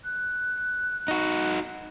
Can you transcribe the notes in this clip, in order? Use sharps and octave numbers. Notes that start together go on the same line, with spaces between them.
F#6
D#4 F#4